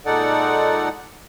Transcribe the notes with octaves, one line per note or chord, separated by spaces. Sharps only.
A#2 G#3 D#4 A4 D5 F#5